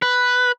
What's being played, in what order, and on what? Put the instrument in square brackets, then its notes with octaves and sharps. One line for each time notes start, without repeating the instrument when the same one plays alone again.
[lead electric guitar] B4